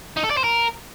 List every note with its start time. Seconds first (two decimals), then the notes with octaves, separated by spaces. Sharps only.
0.17 D#4
0.24 A4
0.30 D5
0.37 C5
0.44 A#4